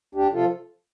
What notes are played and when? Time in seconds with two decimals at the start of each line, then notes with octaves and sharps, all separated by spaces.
0.15 D2 D4 G4
0.33 C3 F3 F4 A4